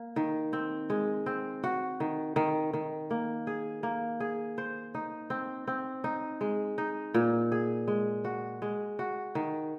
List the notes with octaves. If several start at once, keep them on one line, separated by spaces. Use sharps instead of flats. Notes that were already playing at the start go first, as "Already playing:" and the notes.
Already playing: A#3
D#3
C4
G#3
C4
F#4
D#3
D#3
D#3
A#3
G#4
A#3
G#4
C5
D#4
C4
C4
D#4
G#3
D#4
A#2
G#4
G#3
F#4
G#3
F#4
D#3